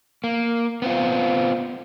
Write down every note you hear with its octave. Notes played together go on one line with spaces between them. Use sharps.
A#3
B3 C4 F4